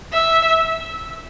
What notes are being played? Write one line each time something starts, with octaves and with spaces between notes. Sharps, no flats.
E5